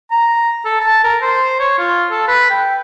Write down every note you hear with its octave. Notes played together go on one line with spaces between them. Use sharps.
A#5
A4
A5
A#4
C5
C#5
F4
A4
B4
G5